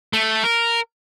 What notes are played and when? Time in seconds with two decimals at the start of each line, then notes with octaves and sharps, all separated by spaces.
0.13 A3
0.44 A#4